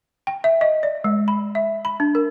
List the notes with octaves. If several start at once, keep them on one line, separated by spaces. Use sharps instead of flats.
G5
E5
D#5
D5
G#3
B5
E5
B5
D4
A#4